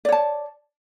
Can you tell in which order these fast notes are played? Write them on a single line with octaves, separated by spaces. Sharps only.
D5 C#5 A5